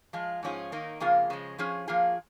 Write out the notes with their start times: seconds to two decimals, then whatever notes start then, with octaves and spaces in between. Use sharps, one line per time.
0.13 F3 G#3 F4 G#4
0.43 G#2 F3 C#4 F4 G#4
0.72 D#3 A#3 D#4
1.00 F2 C#3 A#3 F4 G#4
1.30 C#3 F3 G#3
1.59 F3 C#4 F4 G#4
1.88 F3 A#3 F4 G#4